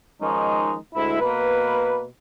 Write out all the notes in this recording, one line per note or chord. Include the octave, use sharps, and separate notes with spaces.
D#3 F3 G#3 C#4 D#4
D2 G#3 E4
B2 A#3 B4